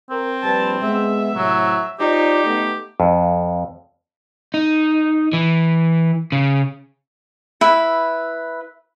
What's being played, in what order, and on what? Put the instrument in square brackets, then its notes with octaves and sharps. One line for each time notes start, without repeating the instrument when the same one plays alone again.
[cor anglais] C4 [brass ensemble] A#4
[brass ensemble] A#1 G3 B4 [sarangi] A5
[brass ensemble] G#3 B3 [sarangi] E5
[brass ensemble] A2 C3 [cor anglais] F#3
[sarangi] D#4 [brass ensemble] F4 C5 D5 [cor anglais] G4
[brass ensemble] A3 B3
[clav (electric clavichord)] F2
[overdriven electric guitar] D#4
E3
C#3
[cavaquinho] E4 B4